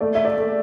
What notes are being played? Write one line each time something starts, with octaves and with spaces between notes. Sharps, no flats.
A3 D5
E5
D5
A3